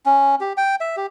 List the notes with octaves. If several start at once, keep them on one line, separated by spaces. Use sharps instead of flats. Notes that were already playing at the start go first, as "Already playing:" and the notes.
C#4
G4
G5
E5
G4